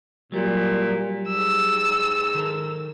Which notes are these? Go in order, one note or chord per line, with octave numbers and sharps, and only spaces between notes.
A#2 F#3 G3
G#2 E6
D#3 A4 A#4